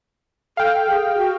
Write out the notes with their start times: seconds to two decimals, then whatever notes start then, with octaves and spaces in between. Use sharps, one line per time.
0.57 A4 F5 G5
0.90 G#4
1.17 F#4